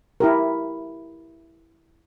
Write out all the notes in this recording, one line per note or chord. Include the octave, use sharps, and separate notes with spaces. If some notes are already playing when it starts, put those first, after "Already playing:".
E4 G4 A#4